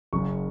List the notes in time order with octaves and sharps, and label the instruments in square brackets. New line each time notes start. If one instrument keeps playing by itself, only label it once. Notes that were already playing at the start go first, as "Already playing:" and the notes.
[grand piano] F#1 F#2 C#3 C#6